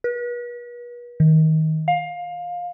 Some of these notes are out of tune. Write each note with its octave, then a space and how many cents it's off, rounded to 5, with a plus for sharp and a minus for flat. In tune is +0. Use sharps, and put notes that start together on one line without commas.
B4 -40
D#3 +20
F5 +20